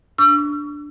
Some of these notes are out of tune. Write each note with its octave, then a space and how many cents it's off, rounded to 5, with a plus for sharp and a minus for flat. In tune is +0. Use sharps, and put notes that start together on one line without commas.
D4 +0 C#6 +30 E6 +40